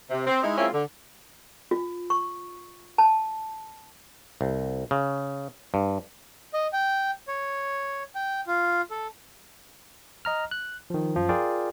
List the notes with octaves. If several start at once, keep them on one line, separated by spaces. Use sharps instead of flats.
C3
C4
G#3 D#4 E4
G#3 A#3 C4 C#4 E4 F4
D3
F4
C#6
A5
C2
C#3
G2
D#5
G5
C#5
G5
F4
A4
D#5 A#5 F6
F#6
D#3 F3
F#2 F3
F4 G#4 A#4 D5 G5